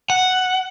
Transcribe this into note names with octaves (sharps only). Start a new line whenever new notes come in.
F#5